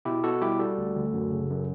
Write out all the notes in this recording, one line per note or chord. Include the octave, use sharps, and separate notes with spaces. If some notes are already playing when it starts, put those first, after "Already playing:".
B2 E4 G4
B2 F#4 A4
G3 E4 G4
G3 F#4 A4
D2
D2
F#2
C#3
F#2